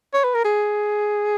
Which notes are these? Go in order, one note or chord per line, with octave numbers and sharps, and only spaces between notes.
C#5
B4
A#4
G#4